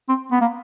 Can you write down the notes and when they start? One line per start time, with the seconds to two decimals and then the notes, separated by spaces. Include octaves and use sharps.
0.09 C4
0.31 B3
0.41 A#3